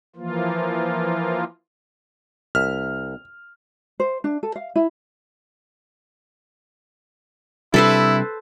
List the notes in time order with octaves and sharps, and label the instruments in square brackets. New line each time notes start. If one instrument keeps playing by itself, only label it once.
[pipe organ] E3 F3 A#3 F4
[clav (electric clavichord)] C2 E5 [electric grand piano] F6
[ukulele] C5
D4
A4
F5
E4
[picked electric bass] C3 G3 D4 [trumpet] E4 [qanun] A4 B4 C5